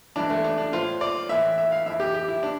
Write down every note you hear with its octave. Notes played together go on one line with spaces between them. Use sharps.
G2 E3 D4
A3
D4
D4
A2 F3 F4
D5
A2 E3 E5
E5
F5
F2 E3 E5
G4
G4
E4
D4